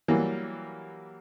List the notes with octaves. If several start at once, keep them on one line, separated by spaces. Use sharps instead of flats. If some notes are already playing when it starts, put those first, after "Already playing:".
E3 F#3 G3 A#3